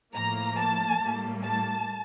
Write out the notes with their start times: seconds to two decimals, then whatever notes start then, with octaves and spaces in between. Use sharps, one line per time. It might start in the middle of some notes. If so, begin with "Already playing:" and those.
0.14 A2 F3 A#3 A#5
0.57 A5
1.01 A2 G3 A#3
1.43 A5